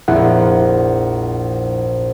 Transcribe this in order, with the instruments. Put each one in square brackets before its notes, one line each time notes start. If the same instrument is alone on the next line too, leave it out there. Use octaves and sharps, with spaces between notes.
[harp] A#1 [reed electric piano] F2 E4 F#5